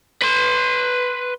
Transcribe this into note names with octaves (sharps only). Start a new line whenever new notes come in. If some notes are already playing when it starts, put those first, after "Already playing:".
B4 C6